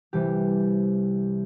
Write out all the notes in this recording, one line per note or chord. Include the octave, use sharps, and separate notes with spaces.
C2 C3 E3 G3 G4